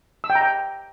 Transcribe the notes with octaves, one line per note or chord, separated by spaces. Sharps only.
E6
G5
A#5
G5